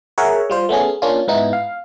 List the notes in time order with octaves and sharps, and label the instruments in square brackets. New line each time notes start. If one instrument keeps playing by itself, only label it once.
[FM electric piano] G#4 A#4 C#5 E5 F#5
G3 F4 C5
A3 B3 C#4 G#4
A#3 C#4 D4 F4
G#2 B3 D#4 E4
F5